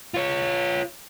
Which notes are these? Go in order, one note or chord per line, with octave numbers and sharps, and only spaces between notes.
F4 C#5